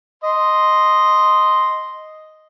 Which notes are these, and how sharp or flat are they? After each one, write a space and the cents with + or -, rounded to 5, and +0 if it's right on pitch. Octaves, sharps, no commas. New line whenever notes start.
D#5 +0 C6 -5